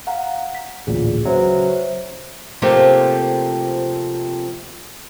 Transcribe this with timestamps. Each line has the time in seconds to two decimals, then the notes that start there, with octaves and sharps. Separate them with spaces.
0.07 F5 F#5 A#5
0.55 B6
0.87 A1 D2 A#2 G#4
1.25 C#3 F#3 B4 C5 E5
2.62 C3 F3 A3 A#3 C4 G4